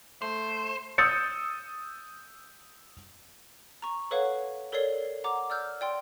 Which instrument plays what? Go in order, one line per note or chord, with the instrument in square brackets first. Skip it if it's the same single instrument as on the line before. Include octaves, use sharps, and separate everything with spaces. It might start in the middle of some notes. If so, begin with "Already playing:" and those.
[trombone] A3 [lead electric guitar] C5
[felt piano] D#6 E6 G6 A6 C#7
[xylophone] A#5 C#6
A4 B4 C#5 F5 F#5
A4 A#4 C#5 D5 C7 G7
F#5 A#5 D6
D5 E6 F6 G6
D5 G5 C6